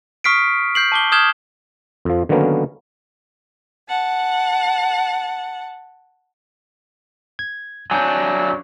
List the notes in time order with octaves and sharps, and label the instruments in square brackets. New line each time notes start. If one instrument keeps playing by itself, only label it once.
[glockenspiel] C#6 D#6 F6 B6 C7 D7
F6 G6 C7 F#7
A5 D6 G7
D#6 F6 G6 G#6 E7 G7
[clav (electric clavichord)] F2 F3
D3 D#3 F#3 A#3 B3 C#4
[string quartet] F#5 A5
[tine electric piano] G#6
[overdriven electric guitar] F#3 D4 [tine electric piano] G#5 G6